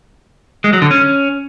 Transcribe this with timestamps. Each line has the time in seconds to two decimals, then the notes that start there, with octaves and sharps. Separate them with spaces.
0.64 G#3
0.73 F#3
0.82 D3
0.91 C#4